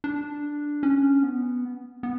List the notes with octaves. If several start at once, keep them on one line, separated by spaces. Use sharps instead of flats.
D4
C#4
B3
B3